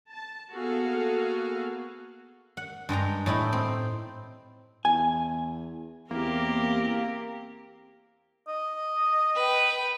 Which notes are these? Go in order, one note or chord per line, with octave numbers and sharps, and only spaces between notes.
A5
A#3 B3 F#4 G#4 A4 F5
F#5
G2 G#3 G5 A#5
A2 D#4 E4 G5
C4
E2 G#5
E2 A#3 C4 G4 A#4
D#5
B4 G5